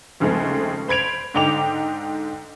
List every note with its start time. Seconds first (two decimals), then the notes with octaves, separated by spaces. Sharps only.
0.20 D#2 C#3 F3 G#3 A3 C4
0.88 C5 B5 G#6 D7 F7
1.34 G#2 D3 D#4 G5 D6 F7